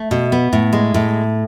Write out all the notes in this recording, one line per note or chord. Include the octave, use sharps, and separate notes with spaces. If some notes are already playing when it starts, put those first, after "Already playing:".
Already playing: A3
B2
B3
A2
G#3
A2